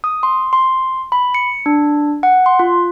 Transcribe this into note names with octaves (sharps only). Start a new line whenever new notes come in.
D#6
C6
C6
B5
C#7
D4
F#5
C6
F4